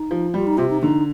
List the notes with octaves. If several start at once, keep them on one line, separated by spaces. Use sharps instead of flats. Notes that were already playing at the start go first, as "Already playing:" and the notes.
Already playing: D#4
F3
G3 F4
D#4
C3 F4
D#4
D3 D#4